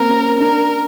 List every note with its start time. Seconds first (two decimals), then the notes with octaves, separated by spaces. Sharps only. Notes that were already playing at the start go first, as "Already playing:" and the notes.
Already playing: A#3 C4 A#4
0.09 C#4
0.40 D4 A#4